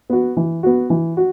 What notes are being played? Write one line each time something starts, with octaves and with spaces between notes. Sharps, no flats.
B3 F#4
E3
B3 F#4
E3
F#4